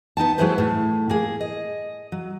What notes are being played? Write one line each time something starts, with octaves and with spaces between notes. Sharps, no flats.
B3 D#4 G5 A5
F#3 A3 E4 G#4 B4 C5
A2 A3
A#3 G#4
D#5
F#3